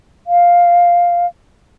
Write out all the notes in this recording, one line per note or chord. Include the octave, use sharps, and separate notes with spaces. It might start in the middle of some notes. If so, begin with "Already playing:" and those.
F5